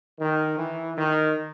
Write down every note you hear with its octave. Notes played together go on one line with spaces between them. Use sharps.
D#3
E3
D#3